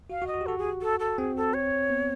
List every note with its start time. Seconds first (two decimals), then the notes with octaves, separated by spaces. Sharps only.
0.10 F#4 F5
0.22 F#4
0.27 D#5
0.34 F#4
0.41 G4
0.46 F#4 A4
0.59 G#4
0.82 A4
1.00 A4
1.18 C4 G#4
1.37 A4
1.54 C#5
1.90 B3